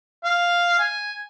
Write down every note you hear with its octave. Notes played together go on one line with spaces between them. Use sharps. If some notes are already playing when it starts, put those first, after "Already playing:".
F5
G#5